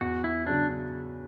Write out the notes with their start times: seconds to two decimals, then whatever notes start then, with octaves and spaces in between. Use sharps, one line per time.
0.01 E2 F#4
0.24 E4
0.46 C#3 F#3 C#4 D4